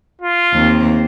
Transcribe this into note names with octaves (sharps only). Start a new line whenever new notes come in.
F4
D#2 C4